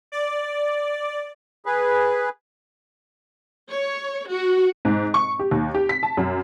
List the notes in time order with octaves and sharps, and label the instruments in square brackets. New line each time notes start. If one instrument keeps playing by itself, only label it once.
[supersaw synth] D5
[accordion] G#4 B4
[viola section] C#5
F#4
[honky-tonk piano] G#2
C#6
G4
D#2
G4
B6
A5
F#2